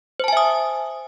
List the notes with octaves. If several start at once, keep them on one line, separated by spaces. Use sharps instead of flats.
C5 E5 G#5 A5 D#6